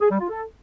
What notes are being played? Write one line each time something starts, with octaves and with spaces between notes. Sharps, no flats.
G#4
G3
F4
A4